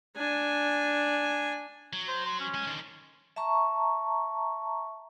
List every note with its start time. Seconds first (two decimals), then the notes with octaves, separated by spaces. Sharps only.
0.17 D4 G#5
1.93 F#3
2.08 C5
2.26 C6
2.40 C#4
2.54 G#3 G#5
2.67 D3 D#3
3.36 E5 A5 A#5 C#6